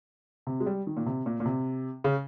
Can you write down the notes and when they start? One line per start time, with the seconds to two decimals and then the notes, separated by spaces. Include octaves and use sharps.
0.47 C3
0.60 G#3
0.66 G3
0.87 D#3
0.97 A#2
1.06 C3
1.26 A#2
1.40 A#2
1.46 C3
2.04 C#3